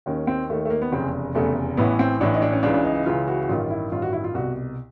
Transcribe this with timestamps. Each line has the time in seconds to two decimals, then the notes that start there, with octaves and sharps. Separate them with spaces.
0.06 D#2 D#3 C#4
0.27 C4
0.49 D#2 D#3 A3
0.65 A3
0.70 A#3
0.82 B3
0.92 F1 E2 C#3 C4
1.35 F1 E2 C#3 A3
1.77 A1 A2 E3 B3
1.99 C4
2.21 A1 A2 E3 D4
2.34 D#4
2.42 D4
2.53 C#4
2.63 C#2 C#3 E3 D4
2.74 D4
2.85 D#4
2.95 D#4
3.06 C#2 C#3 E3 F4
3.28 F#4
3.42 F#4
3.49 A1 G2 D#3 F4
3.70 E4
3.92 A1 G2 D#3 F4
4.02 F#4
4.13 E4
4.24 F4
4.34 C2 B2 F#4